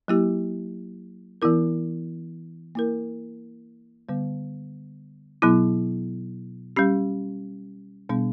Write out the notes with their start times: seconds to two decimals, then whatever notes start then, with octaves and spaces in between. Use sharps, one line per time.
0.08 F#3 A#3 E4 G4
1.42 E3 B3 E4 A#4
2.75 A#3 E4 A#4
4.09 D3 G3 B3
5.42 B2 F#3 B3 E4
6.76 G3 C#4 G4
8.09 B2 G3 B3 D4